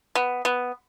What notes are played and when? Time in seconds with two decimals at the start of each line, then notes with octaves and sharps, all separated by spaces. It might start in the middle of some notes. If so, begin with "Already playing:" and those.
0.15 B3
0.45 B3